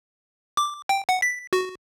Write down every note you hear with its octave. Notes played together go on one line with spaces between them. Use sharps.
D6
G5
F#5
B6
F#4